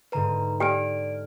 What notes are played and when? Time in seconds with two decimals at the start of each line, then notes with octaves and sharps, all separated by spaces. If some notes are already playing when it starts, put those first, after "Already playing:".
0.12 G#2 D3 B4 A#5 D#7
0.60 G4 D5 G5 F6 D7